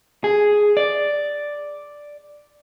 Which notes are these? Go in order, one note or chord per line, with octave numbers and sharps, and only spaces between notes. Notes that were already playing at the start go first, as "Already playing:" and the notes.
G#4
D5